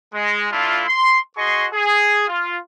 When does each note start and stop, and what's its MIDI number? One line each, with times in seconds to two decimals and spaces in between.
0.14 0.47 56
0.52 0.83 57
0.52 0.83 62
0.52 0.83 64
0.52 0.83 65
0.88 1.19 84
1.37 1.66 66
1.37 1.66 68
1.37 1.66 75
1.37 1.66 84
1.37 1.66 85
1.73 2.25 68
2.28 2.56 65